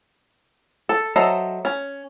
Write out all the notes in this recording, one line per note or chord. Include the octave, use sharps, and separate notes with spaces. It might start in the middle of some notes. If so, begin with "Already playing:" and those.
A4
F#3 A4 C5 D#5 E5
C#4